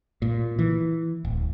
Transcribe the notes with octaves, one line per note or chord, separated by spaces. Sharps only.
A#2
E3
D1